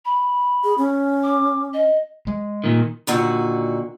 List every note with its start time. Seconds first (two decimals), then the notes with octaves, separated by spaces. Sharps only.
0.05 B5
0.64 G#4
0.78 C#4
1.23 D6
1.74 D#5
2.27 G#3
2.64 A#2 D#3
3.07 D#2 A#2 D3 F#4